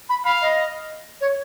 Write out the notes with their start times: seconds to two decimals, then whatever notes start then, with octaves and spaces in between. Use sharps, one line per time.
0.09 B5
0.25 F5 B5
0.41 D#5
1.21 C#5